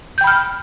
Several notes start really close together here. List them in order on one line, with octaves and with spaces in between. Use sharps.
G6 G5 B5 F6